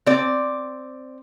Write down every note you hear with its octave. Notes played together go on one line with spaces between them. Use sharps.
C4 D5